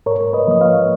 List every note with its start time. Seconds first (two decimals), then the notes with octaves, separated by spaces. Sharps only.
0.06 G#2 A#4 C#5
0.33 B4 D#5
0.47 F3 A#3 D#5
0.61 C#5 F5